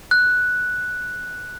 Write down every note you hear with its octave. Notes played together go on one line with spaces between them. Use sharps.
F#6